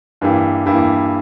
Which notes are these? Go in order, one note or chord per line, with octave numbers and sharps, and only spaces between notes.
G2 E3 A#3 E4 G4
G2 E3 A#3 E4 G4